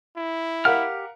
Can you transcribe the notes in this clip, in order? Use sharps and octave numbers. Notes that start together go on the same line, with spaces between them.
E4
G4 A#4 F5 F#5 F6